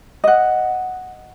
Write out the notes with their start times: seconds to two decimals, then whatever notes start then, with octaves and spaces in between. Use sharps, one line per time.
0.24 D#5 F#5